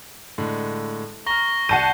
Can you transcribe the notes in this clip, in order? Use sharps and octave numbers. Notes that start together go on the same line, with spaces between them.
A2 D3 G#3
A#5 C#6 F6 A#6 G7
C2 F#5 A5 G6 C7 D#7